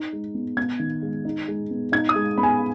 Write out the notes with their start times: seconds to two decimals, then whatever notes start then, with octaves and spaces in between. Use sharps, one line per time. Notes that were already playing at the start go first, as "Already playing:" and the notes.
Already playing: D#4
0.13 G#3
0.35 B3
0.57 B3 G#6
0.79 D#3
1.02 G#3
1.25 D#4
1.48 G#3
1.71 B3
1.92 D#4 G#6
2.09 D#6
2.15 G#3
2.38 B3 B5
2.43 G#5